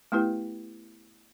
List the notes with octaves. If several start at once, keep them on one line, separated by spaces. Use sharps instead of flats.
A3 B3 E4 G4 B4